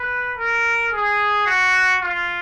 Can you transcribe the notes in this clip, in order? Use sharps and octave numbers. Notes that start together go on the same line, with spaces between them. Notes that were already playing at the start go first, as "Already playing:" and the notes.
Already playing: B4
A#4
G#4
F#4
F4